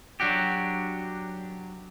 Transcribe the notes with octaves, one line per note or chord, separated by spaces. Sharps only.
F#3 D4 F#4 G4